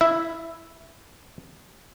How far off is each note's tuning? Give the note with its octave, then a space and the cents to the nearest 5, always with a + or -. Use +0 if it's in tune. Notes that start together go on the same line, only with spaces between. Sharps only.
E4 +0 E5 +0